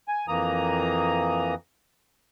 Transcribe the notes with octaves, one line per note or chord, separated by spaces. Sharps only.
G#5
F2 E3 A#3 A#5 D#6